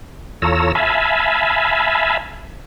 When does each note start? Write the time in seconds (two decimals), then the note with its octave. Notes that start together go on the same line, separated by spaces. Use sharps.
0.42 E2 F4 A4 C#5 A#5 E6
0.75 E5 F5 G#5 A5 B5